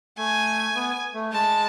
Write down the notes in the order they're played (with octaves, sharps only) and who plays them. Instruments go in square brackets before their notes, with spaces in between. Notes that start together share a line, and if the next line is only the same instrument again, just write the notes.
[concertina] A3 [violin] G#5
[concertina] B3
A3
[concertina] G#3 [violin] A5